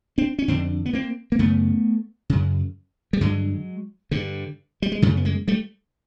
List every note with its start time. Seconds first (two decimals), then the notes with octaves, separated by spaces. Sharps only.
0.18 C4 D4
0.39 C#4
0.48 F2 D3 C4 D4
0.86 B3
0.93 A#3 C4
1.32 A#3
1.39 F#2 C#3 A3 B3
2.30 F#2 C#3
3.13 G3
3.21 G2 D3 F#3 G#3
4.11 G2 D3
4.82 G3
4.92 G#3
5.02 F#2 C#3 G3 A3
5.17 B3
5.25 G#3 A#3
5.48 G3 A3